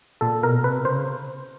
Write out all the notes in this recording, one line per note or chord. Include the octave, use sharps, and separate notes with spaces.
A#2 A4
B2 A#4
C3 B4
C#3 C5